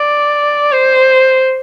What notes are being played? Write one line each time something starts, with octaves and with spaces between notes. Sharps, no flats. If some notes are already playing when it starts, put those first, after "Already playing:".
Already playing: D5
C5